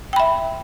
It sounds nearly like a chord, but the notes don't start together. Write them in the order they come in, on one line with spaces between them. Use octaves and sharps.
G5 B5 E5